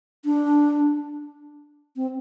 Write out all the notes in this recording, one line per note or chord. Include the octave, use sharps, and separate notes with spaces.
D4
C4